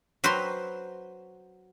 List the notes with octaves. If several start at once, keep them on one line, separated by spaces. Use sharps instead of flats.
F#3 B4 C5 G5 A#5 C6